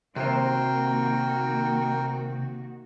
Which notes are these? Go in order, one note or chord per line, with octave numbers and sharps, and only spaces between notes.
C3 D#3 A#3 F#4 A#4 C5 G5